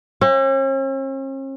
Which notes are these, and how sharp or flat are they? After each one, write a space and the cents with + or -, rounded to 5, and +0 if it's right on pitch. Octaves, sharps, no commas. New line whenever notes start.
C#4 -45